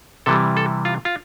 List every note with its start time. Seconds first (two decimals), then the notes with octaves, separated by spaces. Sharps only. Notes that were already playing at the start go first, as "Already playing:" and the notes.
0.26 C3 E3 G3 A4
0.57 A4
0.85 F4
1.05 F4